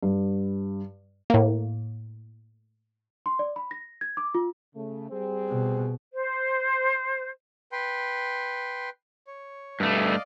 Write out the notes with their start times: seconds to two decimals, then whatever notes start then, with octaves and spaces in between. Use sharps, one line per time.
0.03 G2
1.30 A2 A#3
3.26 C6
3.39 D5
3.56 B5
3.71 A#6
4.01 G#6
4.17 D6
4.35 F4
4.75 C#3 A3
5.10 G3 C4 G#4
5.50 B2
6.13 C5
7.72 B4 G5 C6
9.27 C#5
9.80 G2 A3 D5 D#5 F5